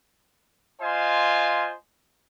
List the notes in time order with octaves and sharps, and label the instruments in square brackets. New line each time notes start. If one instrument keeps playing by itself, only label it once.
[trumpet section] F4 C5 D#5 F5 G#5